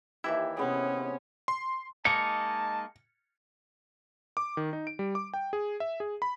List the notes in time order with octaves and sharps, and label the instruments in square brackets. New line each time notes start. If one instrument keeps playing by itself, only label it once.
[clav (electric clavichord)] D#2 E3 E4 [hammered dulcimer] G4 [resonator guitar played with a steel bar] E5
[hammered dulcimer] C3 B3 G#4 [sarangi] C#4
[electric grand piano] C6
[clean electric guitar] G#3 A#3 D#4 [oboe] A5 [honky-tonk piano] C#7
[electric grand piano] D6
D#3
D#4
D7
G3
D6
G5
G#4
E5
G#4
B5